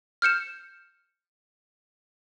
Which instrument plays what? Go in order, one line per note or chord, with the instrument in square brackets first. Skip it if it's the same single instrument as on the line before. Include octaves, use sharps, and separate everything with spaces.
[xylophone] F6 G6 C#7 E7